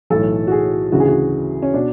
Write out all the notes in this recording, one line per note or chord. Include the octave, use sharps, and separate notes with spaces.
B1 A2 E3 A4
F#4
G#4
D2 C#3 E3 F#4
G#4
F#4
C#4
B2 D4